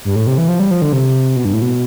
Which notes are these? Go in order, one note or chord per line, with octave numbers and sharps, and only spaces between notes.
G2
A2
C3
E3
F3
G3
F3
D3
C3
B2
G2
A2
B2